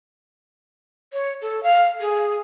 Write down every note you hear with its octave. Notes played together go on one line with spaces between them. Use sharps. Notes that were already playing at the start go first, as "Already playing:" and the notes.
C#5
A4
F5
G#4